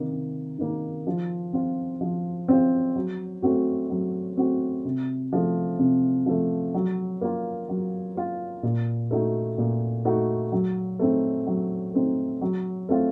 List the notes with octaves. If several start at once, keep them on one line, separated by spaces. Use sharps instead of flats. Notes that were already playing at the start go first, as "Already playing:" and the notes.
Already playing: C3 D#3 A#3
C3
D#3 A#3 D#4
F3
C4 F4
F3
C4 F4
F#3
A3 C4 F#4
F#3
A3 C4 F#4
C3
F3 A3
C3
F3 A3
F#3
A#3 F4
F#3
A#3 F4
A#2
A3 D#4 F#4
A#2
A3 D#4 F#4
F#3
A3 C4 D#4
F#3
A3 C4 D#4
F#3
A3 C4 F4